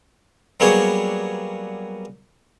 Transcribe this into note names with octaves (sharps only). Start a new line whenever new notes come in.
F#3 G3 A#3 B3 G#4 C#5